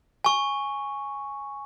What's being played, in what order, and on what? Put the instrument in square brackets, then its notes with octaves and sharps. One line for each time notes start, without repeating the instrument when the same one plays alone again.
[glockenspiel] G#5 C#6